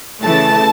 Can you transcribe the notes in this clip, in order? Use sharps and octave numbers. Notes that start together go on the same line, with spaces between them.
C#3 E3 A3 A5